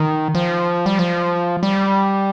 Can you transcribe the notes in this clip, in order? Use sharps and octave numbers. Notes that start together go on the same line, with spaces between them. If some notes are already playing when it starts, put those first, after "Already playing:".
Already playing: D#3
F3
G3
F3
G3